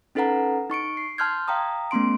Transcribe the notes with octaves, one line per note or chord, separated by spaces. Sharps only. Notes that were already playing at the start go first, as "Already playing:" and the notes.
C#4 D#4 A4 B4 F#5 A#5
D#4 C#6 C#7 D7
C7
A5 C6 F6 G6 G#6
F5 G5 A#5 D#6
A3 B3 C#4 C6 D7